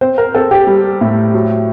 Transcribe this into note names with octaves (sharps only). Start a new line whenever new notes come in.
C4 C5
A#4
C4 A4
G4
G3
A2
F#3